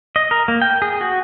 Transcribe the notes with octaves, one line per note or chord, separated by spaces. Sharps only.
D#5
A#4
A#3
G5
G#4
F#4